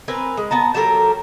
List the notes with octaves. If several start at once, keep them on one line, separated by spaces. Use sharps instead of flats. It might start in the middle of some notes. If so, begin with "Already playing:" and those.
C4 A#4 B4 G#5
G#3
B3 A5 A#5
F#3 G4 A4 A#4